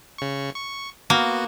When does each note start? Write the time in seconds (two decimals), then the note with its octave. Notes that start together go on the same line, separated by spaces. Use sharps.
0.18 C#3 C#6
0.55 C#6
1.10 A#3 B3 F#4